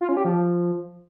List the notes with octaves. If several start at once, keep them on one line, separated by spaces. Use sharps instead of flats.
F4
C#4
G4
F3